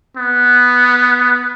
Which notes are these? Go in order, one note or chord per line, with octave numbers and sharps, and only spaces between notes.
B3